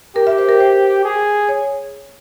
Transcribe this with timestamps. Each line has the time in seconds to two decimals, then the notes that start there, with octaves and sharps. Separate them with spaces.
0.16 G4 A#4
0.27 E5
0.38 C5
0.49 A#4
0.60 C5
1.04 G#4
1.49 C#5